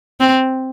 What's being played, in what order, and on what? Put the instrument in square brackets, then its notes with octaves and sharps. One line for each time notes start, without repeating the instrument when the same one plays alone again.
[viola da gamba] C4